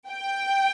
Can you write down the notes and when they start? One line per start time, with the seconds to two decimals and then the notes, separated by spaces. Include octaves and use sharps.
0.09 G5